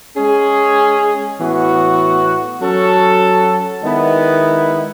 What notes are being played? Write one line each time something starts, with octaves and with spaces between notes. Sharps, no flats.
G#3 C#4 G#4
A2 E3 B3 F#4
F#3 C#4 F#4 A4
D#3 G#3 B3 E4